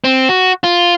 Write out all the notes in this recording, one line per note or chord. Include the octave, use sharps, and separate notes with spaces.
C4
F#4
F4